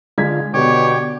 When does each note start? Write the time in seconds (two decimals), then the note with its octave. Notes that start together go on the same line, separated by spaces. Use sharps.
0.18 D3 G#3 F4 G#6 B6
0.54 B2 D3 G4 C#5 G5 D6